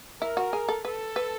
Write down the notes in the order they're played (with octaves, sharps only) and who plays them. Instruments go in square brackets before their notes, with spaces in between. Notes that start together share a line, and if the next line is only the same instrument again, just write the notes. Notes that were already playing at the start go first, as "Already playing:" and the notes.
[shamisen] E4 [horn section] A#4
[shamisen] F#4
G#4
A4
[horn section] A4 [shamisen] B4
[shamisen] B4